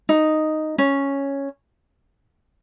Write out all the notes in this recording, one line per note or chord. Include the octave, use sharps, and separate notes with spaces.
D#4
C#4